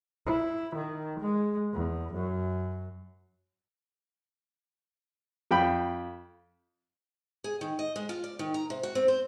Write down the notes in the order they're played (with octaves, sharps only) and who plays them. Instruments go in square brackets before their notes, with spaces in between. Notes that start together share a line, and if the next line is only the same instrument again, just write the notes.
[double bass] E4
D#3
G#3
E2
F#2
[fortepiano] F2 G5 B5
[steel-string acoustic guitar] G#4
D#3
D#5
G#3
F4
D5
D#3
A#5
C3
F#4
C4
C5